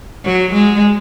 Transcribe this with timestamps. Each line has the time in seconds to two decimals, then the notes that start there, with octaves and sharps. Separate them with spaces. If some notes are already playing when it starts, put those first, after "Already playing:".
0.25 F#3
0.53 G#3